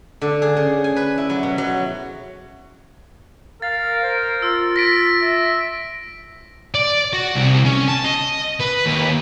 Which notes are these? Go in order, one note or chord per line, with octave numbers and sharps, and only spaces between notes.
D3
G#4
C#3
G#5
B4
E4
F#3
B2
F#3
A#4 F5 A6
C5
F4 E6
A#6 B6 D7
E5
D5
F#4
C2
C#4
A5
D#5
B4
D#2